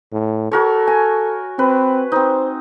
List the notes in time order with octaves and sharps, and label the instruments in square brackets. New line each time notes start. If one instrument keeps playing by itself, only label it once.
[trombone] A2
[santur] F#4 A#4 C#5 [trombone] A4
[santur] G#5
[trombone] C4 [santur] B4
[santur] C4 D#4 [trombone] C5